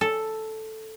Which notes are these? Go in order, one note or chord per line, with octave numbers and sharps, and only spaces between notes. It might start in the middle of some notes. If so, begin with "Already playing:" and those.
A4